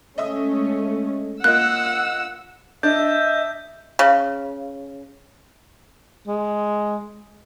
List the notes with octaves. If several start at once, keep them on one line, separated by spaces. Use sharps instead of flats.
G#3 A3 C#4 D#5 E5 D#6
A#3 F4 D#5 F#5 E6 F#6
D4 D#5 E5 G6
C#3
G#3